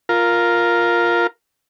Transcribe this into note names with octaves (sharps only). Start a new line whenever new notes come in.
F4 A#4